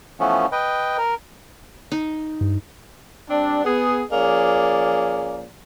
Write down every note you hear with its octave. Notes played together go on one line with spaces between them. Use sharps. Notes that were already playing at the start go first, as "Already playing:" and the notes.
E3 F3 A3 B3 C#4
B4 D#5 G5
A#4
D#4
G2
G3 C4 D4
B3 G#4
F3 A#3 C#4 G#4 D5